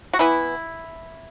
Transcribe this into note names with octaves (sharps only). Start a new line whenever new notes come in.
F#4
E3 B3 E4